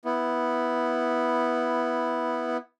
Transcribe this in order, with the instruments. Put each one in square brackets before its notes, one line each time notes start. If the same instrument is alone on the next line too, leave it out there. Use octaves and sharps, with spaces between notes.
[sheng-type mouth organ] B3 E4